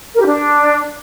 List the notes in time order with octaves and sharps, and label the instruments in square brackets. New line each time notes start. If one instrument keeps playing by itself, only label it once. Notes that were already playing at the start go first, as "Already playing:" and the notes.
[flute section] A#4
G4
D4